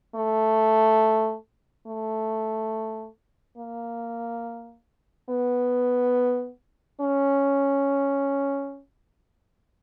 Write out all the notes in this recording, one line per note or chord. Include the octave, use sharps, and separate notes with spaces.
A3
A3
A#3
B3
C#4